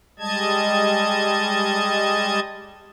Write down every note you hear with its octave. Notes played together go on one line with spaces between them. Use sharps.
G3 G#3 D#5 A5 G#6